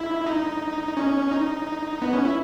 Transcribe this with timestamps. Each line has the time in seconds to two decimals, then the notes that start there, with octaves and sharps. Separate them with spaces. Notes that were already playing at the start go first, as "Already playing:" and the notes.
Already playing: E4
0.26 D#4
0.97 C#4
1.31 D#4
2.02 B3
2.13 C#4
2.25 E4